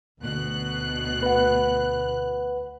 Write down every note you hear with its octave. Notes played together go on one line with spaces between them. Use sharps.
D2 B2 F#6
B4 F#5